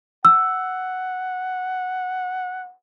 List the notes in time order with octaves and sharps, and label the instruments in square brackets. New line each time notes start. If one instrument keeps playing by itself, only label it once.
[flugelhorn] F#5 [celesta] E6